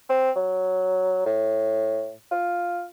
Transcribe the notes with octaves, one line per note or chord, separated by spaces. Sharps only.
C4
F#3
A2
F4